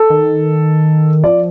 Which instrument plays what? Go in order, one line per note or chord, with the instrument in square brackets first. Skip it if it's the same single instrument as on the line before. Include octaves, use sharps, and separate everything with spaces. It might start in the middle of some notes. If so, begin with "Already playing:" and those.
Already playing: [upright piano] A4
[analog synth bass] D#3
[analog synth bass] F3 [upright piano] D5